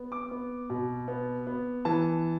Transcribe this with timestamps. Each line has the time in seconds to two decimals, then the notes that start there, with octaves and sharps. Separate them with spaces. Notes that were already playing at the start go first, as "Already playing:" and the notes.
Already playing: B3
0.12 D6
0.31 B3
0.70 B2
1.08 B3
1.47 B3
1.85 E3 A5